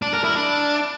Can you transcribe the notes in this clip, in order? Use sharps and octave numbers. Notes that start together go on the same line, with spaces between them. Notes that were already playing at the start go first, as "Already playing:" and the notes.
D4
A#4
E4
D4